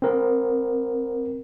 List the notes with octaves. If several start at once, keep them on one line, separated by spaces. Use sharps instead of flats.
C4 A#4